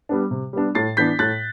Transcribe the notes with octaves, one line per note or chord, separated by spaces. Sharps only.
G3 B3 D4
C3
G3 B3 D4
A2 A6 C7
E3 B3 D4 G6 B6
A2 F#6 A6